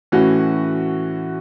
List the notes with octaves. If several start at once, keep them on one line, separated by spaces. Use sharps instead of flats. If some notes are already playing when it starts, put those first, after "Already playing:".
A2 E3 C#4 F#4